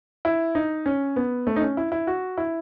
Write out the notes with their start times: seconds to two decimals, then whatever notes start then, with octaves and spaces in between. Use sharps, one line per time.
0.25 E4
0.55 D#4
0.86 C#4
1.16 B3
1.47 A3
1.56 D#4
1.61 C#4
1.77 E4
1.92 E4
2.07 F#4
2.38 E4